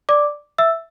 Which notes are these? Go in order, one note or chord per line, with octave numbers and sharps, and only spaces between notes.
D5 D6
E5 E6